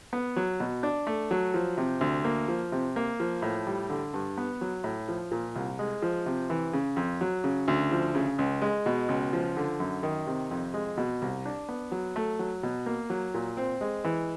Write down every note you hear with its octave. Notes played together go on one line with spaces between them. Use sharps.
B3
F#3
B2
D4
A3
F#3
F3
C3
D2
A#3
F3
C3
A#3
F3
A2
G3
D3
G2
B3
F#3
A2
F3
A#2
C2
G#3
F3
C3
E3
C#3
F2
F#3
C#3
D2
F3
C#3
C#2
G#3
B2
C#2
F3
D3
F#2
D#3
C3
F2
G#3
B2
C2
D4
B3
F#3
A3
F#3
B2
A#3
F#3
A#2
C4
G#3
E3